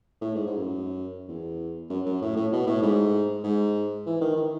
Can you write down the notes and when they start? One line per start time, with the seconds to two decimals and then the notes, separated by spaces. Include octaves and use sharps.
0.21 A2
0.35 G#2
0.47 G#2
0.57 F#2
1.28 E2
1.90 F#2
2.06 F#2
2.22 A2
2.36 A2
2.52 B2
2.67 A2
2.82 G#2
3.44 G#2
4.06 E3
4.21 D#3
4.37 D#3